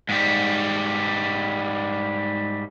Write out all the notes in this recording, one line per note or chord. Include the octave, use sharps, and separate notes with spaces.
G#2 G3